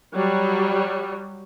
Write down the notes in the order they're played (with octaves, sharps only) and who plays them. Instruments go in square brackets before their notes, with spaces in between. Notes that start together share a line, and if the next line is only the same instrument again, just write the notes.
[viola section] F#3 G3